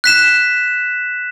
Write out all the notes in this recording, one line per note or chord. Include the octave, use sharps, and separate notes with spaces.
F#6 B6 E7